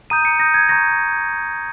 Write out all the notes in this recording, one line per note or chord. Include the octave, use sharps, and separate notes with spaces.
A#5 D#6 G6 D#7
C#7
A#5 D#6 G6 A#6
G#6
A#5 C#6 G6 A#6